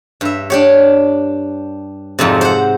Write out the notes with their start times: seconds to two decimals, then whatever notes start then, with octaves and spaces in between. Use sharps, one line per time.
0.21 G2 E5
0.50 D4 G4 C#5
2.19 F2 G#2 C3
2.41 C5 F#5